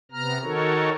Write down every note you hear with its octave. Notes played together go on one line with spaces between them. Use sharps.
C3 B3 A#5 F6
D#3 D#4 F#4 A4 A#4 C#5